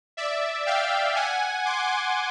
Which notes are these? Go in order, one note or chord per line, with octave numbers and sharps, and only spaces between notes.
D5 E5
F5 G5
F#5 G#5
C6 D6